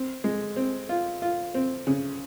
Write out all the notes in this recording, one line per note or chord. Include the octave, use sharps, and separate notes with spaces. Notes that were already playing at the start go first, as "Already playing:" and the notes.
Already playing: C4
G#3
C4
F4
F4
C4
C#3